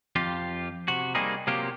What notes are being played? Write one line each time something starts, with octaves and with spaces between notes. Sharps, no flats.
F2 F4 G4
C3 F#4
G3 A#3 C4 D#4 G#4
C3 F#3 A#3 F4 G4